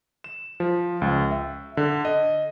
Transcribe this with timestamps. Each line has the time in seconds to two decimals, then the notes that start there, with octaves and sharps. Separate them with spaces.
0.24 E7
0.60 F3
1.02 C#2
1.31 E5
1.77 D3
2.05 D#5